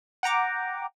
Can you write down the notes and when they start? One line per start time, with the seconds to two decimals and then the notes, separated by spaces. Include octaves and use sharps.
0.23 F#5 G5 A#5 D6